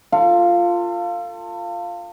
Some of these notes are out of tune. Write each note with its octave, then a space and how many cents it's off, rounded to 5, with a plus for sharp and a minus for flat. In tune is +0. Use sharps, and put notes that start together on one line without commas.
F4 +0 A4 +35 F5 +0